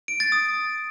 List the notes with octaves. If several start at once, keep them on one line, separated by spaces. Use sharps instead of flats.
D7
A6
D#6